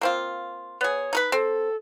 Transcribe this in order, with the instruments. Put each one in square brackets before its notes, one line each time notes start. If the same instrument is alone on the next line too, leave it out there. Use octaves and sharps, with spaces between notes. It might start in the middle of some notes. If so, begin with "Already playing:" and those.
[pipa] A#3 C4 F4
[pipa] B3 G#4 [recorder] C#5
[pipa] D#4 A#4 B4
[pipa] C4 [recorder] A4